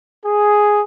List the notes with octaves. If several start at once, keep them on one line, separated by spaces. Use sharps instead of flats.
G#4